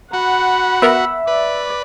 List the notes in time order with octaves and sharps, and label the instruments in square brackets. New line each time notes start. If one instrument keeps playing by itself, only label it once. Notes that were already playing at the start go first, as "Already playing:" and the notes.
[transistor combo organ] F#4 [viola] F#5 B5
[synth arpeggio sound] B3 A#4 [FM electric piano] E5
[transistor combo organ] B4 [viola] D5